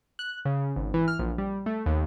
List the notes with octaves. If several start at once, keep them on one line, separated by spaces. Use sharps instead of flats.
F#6
C#3
G#1
E3
F6
A#1
G3
A3
D#2